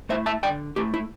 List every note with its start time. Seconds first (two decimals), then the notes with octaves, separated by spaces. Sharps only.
0.09 A3 E4 C5 E5
0.26 E5 A5
0.43 D3 D5 G5
0.76 A3 E4 G4
0.94 E4